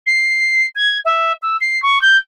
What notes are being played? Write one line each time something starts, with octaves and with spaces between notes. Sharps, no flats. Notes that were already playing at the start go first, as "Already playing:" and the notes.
C7
G#6
E5
E6
C7
C#6
G6